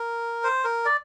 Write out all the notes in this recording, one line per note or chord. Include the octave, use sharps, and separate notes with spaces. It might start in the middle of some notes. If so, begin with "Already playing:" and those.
Already playing: A#4
C5
A#4
D5